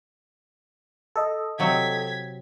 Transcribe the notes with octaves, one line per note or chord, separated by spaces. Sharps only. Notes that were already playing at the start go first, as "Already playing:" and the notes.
A4 D#5
C3 F#3 C4 G#6 B6